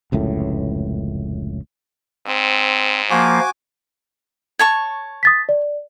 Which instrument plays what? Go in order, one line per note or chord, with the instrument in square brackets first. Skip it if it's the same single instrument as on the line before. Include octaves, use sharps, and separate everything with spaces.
[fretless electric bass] F1 C#2 F#2 A2
[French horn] G#2 [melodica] C4
[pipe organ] F3 A#3 [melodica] F#4 G#5 D6
[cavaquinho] C#5 A5 C#6
[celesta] D#6 A6 B6
D5